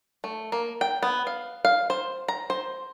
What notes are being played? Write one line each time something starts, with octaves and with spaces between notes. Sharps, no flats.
A3
A#3
G5
B3
F5
F5
C5
A#5
C5